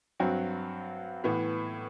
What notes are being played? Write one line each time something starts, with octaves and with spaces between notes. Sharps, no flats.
G2 F#3 C4 F#4
A2 E3 B3